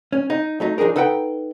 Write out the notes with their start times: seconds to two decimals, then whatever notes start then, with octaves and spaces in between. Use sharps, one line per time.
0.13 C#4
0.30 D#4
0.60 F#3 A3 D#4
0.78 F3 D4 D#4 G#4 A#4
0.96 D#4 A4 B4 F#5 G5